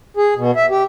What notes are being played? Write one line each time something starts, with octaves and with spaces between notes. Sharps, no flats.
G#4
B2
E5
G4